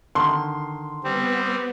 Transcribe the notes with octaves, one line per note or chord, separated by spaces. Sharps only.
D3 D#3 C6
G3 B3 C4